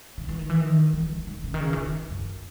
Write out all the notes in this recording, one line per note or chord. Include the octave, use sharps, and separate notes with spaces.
D#3
E3
D#3
E3
D#3
E3
F#3
D#3
C#3
D#3
C#3
E3
D#3
C#3
F#2